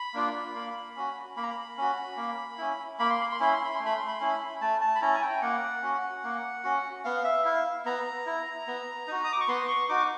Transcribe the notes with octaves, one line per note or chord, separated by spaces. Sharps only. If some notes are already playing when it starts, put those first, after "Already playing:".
Already playing: B5
A#3 D4 F4
A#3
C#4 F#4
A#3 B5
A#5
B5
C#4 F#4
A#3
C#4 E4
A#3 B5
C6
B5
C6
C#4 E4 B5
C6
B5
A3 C6
B5
C6
B5
C#4 E4
A3 A5
A5
B5
C#4 E4 A#5
G#5
G5
A#3 F#5
C#4 F#4
A#3
C#4 F#4
B3 F5
E5
E4 F5
B3 A#5
E4
B3
D#4 F#4
D#6
D6
C#6
B3 C6
C#6
D#4 F#4 D6